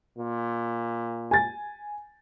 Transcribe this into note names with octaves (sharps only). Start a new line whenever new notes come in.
A#2
G#5 A6